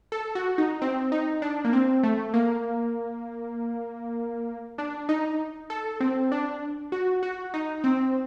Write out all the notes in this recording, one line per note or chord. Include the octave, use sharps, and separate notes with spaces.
A4
F#4
D#4
C4
D#4
D4
A#3
C4
A3
A#3
D4
D#4
A4
C4
D4
F#4
F#4
D#4
C4